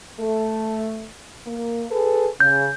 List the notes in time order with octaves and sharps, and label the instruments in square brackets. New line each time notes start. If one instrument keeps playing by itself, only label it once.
[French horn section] A3
A#3
G#4 A4 B4
[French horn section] C#3 [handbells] G6